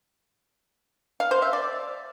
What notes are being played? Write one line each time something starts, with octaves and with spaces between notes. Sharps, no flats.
F5
C5
E5
D5